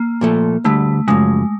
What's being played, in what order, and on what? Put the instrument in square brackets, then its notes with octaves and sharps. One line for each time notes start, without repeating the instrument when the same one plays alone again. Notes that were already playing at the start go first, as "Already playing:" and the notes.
Already playing: [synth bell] A#3
[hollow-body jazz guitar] A#2 F3 A3
[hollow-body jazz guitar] D2 D3 G3 [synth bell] A3
[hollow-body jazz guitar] F#2 C#3 F3 [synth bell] G#3